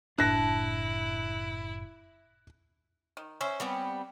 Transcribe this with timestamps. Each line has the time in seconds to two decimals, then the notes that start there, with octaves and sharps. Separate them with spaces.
0.18 F#1 A2 D4 E4 A5 F#6 A#6
3.17 D#3
3.41 C#4 C5 E5
3.60 G3 B3 C4